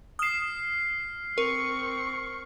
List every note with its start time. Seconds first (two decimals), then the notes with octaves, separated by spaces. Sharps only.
0.19 D#6 F6 C7 E7
1.38 C4 A#4 C#6